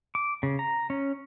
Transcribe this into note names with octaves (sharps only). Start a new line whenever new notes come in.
D6
C#3
A#5
C#4